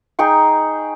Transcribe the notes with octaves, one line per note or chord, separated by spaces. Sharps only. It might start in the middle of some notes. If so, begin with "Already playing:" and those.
D#4 G#4 G5 C#6